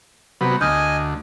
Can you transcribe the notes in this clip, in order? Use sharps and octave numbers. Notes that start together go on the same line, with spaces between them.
C3 F#3 B3
D2 D#5 G#5 D#6 F6 G6